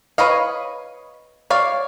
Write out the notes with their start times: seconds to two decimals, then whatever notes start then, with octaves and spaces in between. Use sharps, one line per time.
0.18 B4 C#5 D#5 F5
1.50 C#5 D5 F5